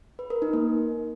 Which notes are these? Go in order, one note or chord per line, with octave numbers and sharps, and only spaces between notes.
B4
A#4
D#4
A#3